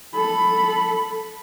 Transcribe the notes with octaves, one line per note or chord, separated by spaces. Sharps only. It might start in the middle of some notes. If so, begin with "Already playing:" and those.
A4 B5